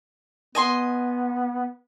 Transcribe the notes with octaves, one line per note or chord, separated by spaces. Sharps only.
B3 D#5 G#5 C6